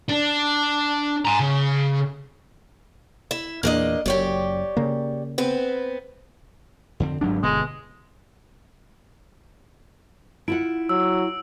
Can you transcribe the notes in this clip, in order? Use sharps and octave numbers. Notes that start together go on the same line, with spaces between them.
D4
G#5 A#5
C#3
E4 E5
E2 A#2 A#3 D4 D#5
F#1 F#2 G4 C#5 D5
C#3 A#3
B3 C4 B4
F2 D3 C4
G1 G#2 F#3 D4
G1 B2 D3 G#3 B3
E4 F4 F#5 D7
F#3 E6